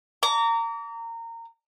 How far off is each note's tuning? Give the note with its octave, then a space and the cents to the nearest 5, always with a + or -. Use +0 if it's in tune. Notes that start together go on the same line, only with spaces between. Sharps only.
A#5 -20 D6 -40